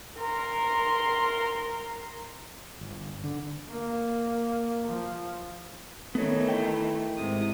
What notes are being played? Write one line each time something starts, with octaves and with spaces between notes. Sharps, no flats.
A#4 C6
G1
D3
A#3
F3
D#3 E3 A3 B3 C#5
E4 G5
G#2 C3 D#6